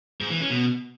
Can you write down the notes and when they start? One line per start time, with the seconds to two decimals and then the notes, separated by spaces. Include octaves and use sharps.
0.21 G#2
0.30 E3
0.40 C#4
0.50 B2